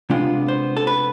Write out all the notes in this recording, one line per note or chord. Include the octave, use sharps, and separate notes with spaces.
C3 G#3 B3 D4 F4
C5
A4
B4